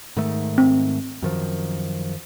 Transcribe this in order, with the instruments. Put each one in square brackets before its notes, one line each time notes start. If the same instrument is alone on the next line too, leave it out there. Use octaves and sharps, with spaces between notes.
[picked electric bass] G#2 D#3 A3
[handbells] C4
[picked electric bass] F#2 D#3 F3